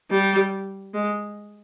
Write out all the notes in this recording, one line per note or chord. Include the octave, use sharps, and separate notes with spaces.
G3
G#3